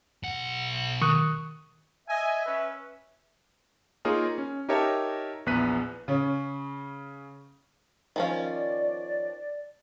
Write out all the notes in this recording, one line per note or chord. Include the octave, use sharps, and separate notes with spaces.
B1 F#5
D#3 C#6 D#6 F#6
D#5 E5 G#5
C#4 B4
A#3 D#4 F4 G#4 A#4 C#5
C#4
D#4 G4 A#4 C#5 E5 A5
A#1 E2 B3 F#6 B6 D#7
C#3 C#4
D#3 F3 C#4
D5